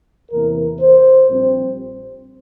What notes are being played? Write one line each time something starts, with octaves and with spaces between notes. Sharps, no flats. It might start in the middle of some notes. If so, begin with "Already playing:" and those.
E2 C3 E3 A#3 A#4
C5
A#1 A#2 G3 C4